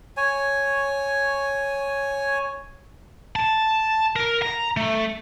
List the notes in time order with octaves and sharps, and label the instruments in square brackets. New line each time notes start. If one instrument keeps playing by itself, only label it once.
[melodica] C#5 G#5
[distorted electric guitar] A5
A#4
A#5
A3